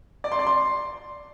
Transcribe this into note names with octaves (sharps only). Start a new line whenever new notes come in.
D5
C6
D5
C6